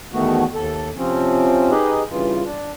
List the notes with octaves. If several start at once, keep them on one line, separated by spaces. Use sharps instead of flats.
E2 B2 D#3 A3 B3 F#4
D#2 A4
C3 F3 C4 C#4
D#4 G4 G#4 B4 D#5
G2 C#3 E3 F4
D4